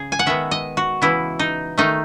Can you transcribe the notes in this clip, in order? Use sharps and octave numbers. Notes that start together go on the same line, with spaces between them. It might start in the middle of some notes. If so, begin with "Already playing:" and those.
Already playing: C#3 G#4
G#5
F#5
D#3 G#3 B3 E5
D#5
F#4
C#3 E3 B3 E4
D#4
D#3 A3 D#4